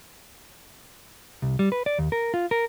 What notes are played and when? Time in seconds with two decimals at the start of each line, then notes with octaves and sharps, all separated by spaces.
1.42 C2
1.59 G3
1.72 B4
1.86 D5
1.99 D#2
2.12 A#4
2.34 F4
2.51 A#4